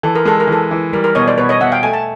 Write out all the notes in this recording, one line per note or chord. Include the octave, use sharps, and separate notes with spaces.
E3 A4
A#4
G#3 A4
A#4
E3 A4
E3
G3 A#4
A#4
B2 C#5 D#5
C5 D5
B2 B4 C#5
C#5 D#5
B2 E5 F#5
F5 G5
A3 G#5
A5